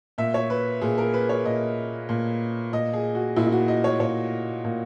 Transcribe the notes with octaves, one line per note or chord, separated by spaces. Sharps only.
A#2 E5
C#5
B4
A#2 G#4
A#4
B4
C#5
A#2 D#5
A#2
A#2 D#5
G#4
F#4
A#2 E4
E4
F#4
D#5
C#5
A#2 C#5
A#2